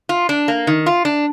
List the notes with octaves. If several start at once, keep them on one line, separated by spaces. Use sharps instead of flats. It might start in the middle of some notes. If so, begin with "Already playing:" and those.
F4
D4
A#3
D#3
F4
D4